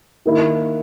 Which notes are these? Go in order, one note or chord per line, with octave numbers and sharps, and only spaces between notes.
D#3 A#3 E4